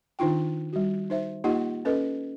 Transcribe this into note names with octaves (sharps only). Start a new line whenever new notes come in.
D#3 D4 D#4 F4 G5
G3 F#4
D#4 C5 E5
A#3 D#4 F4 G4 D#5 F#5
C#4 A4 B4 D#5